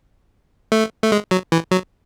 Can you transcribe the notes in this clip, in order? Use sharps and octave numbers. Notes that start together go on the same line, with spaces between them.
A3
A3
G#3
F#3
E3
F#3